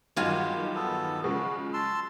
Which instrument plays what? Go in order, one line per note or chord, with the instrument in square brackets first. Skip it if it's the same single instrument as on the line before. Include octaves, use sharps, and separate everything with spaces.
[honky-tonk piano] E2 G2 D#3 [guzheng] F#3 F4 G#5
[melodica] B3 A4
[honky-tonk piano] C#3 F3 G#3 [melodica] F#4
[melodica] A5 C6 E6